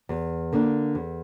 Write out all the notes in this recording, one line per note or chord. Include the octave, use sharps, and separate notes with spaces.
E2
D3 A#3 D4
E2